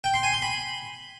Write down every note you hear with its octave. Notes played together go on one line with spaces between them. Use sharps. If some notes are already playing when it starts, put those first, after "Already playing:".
G5
C6
G#5
C6
B5